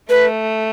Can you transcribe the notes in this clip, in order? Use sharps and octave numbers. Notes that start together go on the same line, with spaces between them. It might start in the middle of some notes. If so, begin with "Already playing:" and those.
A3 B4